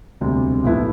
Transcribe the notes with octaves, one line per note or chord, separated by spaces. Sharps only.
E1 D2 C3 G3
B1 A2 F3 B3 E4